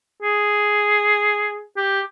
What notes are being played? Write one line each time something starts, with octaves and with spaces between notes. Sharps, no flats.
G#4
G4